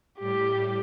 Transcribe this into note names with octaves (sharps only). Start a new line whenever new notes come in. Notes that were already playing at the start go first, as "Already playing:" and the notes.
A2 G3 G4